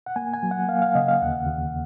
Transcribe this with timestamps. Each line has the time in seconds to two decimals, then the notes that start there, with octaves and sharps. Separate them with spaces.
0.06 F#5
0.16 A#3 G#5
0.33 G#5
0.43 F#3
0.51 F#5
0.68 A#3 F5
0.82 F5
0.95 C#3 D#5
1.08 F5
1.22 D#2 F#5
1.47 D#2